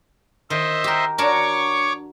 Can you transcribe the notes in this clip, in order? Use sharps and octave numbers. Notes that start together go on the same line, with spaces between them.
D#3 C5 D#5 E5
G4 A#4
D4 F#4 A#4 C#5 C#6 D6